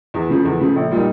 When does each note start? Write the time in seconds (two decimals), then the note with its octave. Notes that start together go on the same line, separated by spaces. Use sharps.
0.14 E2
0.29 C#3 F3 A3
0.45 E2
0.60 C#3 F3 A3
0.76 A#1
0.91 A#2 G3 A#3 D#4